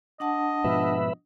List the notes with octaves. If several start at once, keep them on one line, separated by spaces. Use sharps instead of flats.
D4 D#5 F#5 A5
G#2 B2 F3 B4 E5